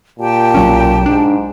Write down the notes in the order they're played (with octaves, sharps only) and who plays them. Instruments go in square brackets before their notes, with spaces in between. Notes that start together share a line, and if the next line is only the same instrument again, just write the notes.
[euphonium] A#2 [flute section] G4 G5 A5
[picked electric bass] B1 F#3 C#4
[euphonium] G#2 [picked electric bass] D4